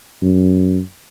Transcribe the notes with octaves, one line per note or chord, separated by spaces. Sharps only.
F#2